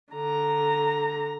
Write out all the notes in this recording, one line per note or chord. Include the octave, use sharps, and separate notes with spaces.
D3 A#5